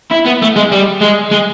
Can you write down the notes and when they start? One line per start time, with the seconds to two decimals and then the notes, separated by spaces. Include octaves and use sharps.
0.11 E4
0.26 B3
0.42 A3
0.56 G#3
0.72 G3
1.01 G#3
1.31 G#3